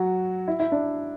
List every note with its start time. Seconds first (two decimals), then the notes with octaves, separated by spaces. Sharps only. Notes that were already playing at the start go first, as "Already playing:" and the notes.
Already playing: F#3 F#4
0.48 E4
0.60 E4
0.72 D4